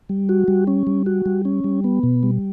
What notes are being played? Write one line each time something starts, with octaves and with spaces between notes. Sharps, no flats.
G3
F#4
G3
C#4
G3
F#4
G3
C#4
G3
B3
B2
G3